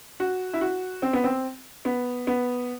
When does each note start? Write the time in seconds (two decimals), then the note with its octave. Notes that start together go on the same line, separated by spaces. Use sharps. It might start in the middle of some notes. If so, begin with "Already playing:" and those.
0.20 F#4
0.53 E4
0.61 F#4
1.02 C4
1.13 B3
1.24 C4
1.85 B3
2.27 B3